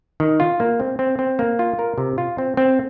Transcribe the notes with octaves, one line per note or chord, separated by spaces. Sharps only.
D#3
F4
A#3
C4
C4
C4
A#3
F4
A#4
C3
F4
C4
C4